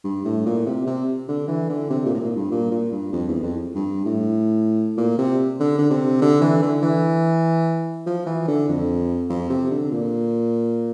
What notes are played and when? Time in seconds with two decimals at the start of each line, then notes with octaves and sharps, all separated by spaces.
0.04 G2
0.25 A2
0.46 A#2
0.66 C3
0.87 C3
1.28 D3
1.48 E3
1.69 D3
1.90 C3
2.05 A#2
2.14 A2
2.20 A#2
2.36 G2
2.51 A#2
2.71 A#2
2.92 G2
3.13 F2
3.29 E2
3.43 F2
3.75 G2
4.06 A2
4.97 A#2
5.18 C3
5.60 D3
5.79 D3
5.90 C3
6.22 D3
6.41 E3
6.62 D3
6.82 E3
8.06 F3
8.26 E3
8.48 D3
8.69 F2
9.30 F2
9.50 C3
9.71 D3
9.92 A#2